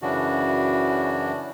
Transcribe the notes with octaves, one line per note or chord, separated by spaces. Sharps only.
F#2 C#3 E3 D4 F#4